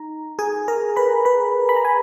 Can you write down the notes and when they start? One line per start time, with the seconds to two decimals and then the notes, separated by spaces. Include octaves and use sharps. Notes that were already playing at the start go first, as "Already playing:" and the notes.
Already playing: D#4 A#5
0.39 G#4 G#5
0.68 A#4 A#5
0.96 B4 B5
1.25 B4 B5
1.69 B5
1.76 A#5
1.85 G#5